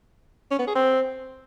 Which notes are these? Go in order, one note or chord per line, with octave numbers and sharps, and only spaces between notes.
C#4
B3
G#4
C4